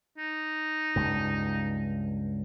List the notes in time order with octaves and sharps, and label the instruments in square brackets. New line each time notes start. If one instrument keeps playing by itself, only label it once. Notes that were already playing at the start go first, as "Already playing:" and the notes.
[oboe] D#4
[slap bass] C#2 G2